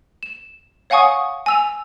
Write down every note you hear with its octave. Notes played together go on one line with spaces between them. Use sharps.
E7
C#5 F5 F#5 G#5 C#6 D#6
G#5 E6 F7